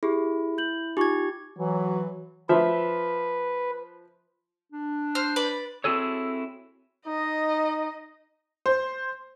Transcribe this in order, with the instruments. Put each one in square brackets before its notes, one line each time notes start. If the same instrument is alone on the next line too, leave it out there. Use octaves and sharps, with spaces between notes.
[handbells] E4 [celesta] G4 G#4
[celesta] G6 F#7
[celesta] D#4 F4 C#6 [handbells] G4 G#6
[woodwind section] E3 [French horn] F#3
[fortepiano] F3 E5 [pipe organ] B4
[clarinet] D4
[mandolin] C5 F6
B4 D5
[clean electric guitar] C4 E4 F#4 G#4 A4 C#5
[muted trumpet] D#4 [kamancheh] D#5
[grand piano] C5